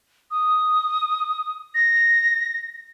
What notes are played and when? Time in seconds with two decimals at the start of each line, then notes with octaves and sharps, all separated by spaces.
0.31 D#6
1.75 A#6